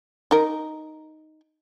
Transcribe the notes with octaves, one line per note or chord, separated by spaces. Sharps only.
D#4 A#4